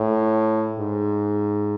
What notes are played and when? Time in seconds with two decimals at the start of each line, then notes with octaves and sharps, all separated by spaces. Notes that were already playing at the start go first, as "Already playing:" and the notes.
Already playing: A2
0.79 G#2